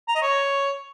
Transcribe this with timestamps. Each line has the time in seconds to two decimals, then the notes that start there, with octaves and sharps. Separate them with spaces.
0.08 A#5
0.15 D#5
0.22 C#5